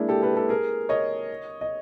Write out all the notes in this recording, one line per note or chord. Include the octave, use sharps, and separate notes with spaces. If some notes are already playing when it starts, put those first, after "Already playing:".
Already playing: G#3 A#3 D4 E4
G4 A4
A4 B4
G4 A4
G#4 A#4
C#5 D#5
D#5